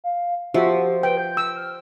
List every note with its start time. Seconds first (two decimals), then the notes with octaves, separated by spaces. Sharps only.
0.04 F5
0.54 F3 F#4 G4 E5
1.03 B4 G5
1.17 G6
1.37 E6
1.56 F6